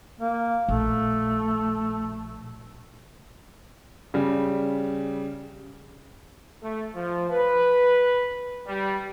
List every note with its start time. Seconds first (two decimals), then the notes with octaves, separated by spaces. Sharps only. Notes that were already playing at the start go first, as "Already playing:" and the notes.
0.20 A#3
0.69 A#1 A3
4.14 C#3 G3
6.63 A3
6.95 F3
7.31 B4
8.67 G3